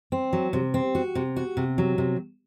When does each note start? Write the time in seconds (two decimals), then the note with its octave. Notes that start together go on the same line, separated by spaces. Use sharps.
0.12 C4
0.33 F#3
0.53 C3
0.74 C4
0.95 F#4
1.15 C3
1.36 F#4
1.57 C3
1.78 F#3
1.98 C3